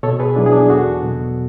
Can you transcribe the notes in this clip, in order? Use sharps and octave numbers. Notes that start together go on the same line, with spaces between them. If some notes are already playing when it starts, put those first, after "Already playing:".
B2 A4 C#5
G#4 B4
F#3 B3 D4 E4
G#4
D4 F#4
E2 F#4 A4
B2 F#3 B3